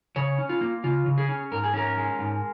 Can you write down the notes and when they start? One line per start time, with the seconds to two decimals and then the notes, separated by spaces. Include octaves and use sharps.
0.16 C#3 C#5
0.38 C#4
0.49 F4
0.61 A#3
0.84 C#3 F4
1.06 C#3
1.18 G#4
1.29 C#4
1.52 G#2 A#4
1.64 G#4
1.74 C#4 A#4
1.97 G#3
2.19 G#2